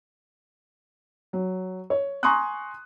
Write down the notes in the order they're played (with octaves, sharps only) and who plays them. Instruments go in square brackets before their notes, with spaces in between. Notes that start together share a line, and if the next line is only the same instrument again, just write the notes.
[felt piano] F#3
C#5
G#5 A#5 C6 C#6 D#6 F#6